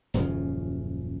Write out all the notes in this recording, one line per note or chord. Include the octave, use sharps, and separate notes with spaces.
D#1 F#2 C#3 F3